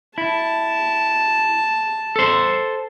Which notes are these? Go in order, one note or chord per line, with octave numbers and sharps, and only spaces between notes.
E4 A5
A4 C5